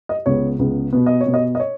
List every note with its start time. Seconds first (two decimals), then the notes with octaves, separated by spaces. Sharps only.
0.09 D#5
0.26 C#2 C#3 B3 C#5
0.59 C#2 C#3 B3
0.93 B2 B3
1.06 D#5
1.21 C#5
1.26 B2 B3
1.34 D#5
1.55 D#5
1.60 C#5